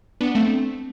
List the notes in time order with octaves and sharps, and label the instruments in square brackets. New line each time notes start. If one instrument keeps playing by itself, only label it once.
[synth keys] B3 D4
A3 C4